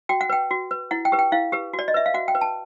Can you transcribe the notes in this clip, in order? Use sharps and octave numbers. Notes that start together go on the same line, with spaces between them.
F#4 G5
F#5
B4 G5
F#4
B4
E4 F#5
G5
G4 B4
G5
E4 F5
G4 B4
F#4
D5
D#5
B4 E5
F5
F#4 F#5
G5
B4
A5